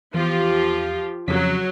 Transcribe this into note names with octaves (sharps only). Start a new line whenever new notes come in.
E2 F3 F4 G4
F2 C#3 F#3 B6